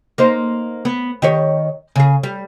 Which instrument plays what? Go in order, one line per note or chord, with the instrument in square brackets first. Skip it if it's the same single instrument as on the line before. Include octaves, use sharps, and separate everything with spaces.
[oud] A#3 D#4 C5
B3
D#3 G4 C#5
C#3 G#4
G3